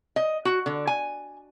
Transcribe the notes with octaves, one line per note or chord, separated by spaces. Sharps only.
D#5
F#4
D3
G#5